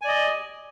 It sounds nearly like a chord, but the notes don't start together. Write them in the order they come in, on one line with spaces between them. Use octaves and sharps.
G#5 D5 D#5